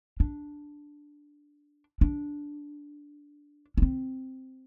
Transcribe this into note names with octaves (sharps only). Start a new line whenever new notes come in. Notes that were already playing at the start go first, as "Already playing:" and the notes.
D4
D4
C#4
C4